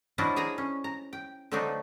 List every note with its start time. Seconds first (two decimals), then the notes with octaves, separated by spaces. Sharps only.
0.18 F3 F#3 D4 E4 F4 D#5
0.36 G#4 G#5 A#5
0.58 C#4
0.84 A#5
1.13 G5
1.52 D3 F3 F#3 A3 D4 D#4